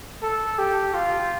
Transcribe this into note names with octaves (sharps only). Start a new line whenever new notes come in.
A4
G4
F4